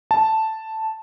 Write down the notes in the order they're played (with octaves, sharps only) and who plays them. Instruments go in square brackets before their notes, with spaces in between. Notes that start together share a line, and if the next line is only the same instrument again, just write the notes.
[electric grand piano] A5